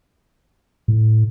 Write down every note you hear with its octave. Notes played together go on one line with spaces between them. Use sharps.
A2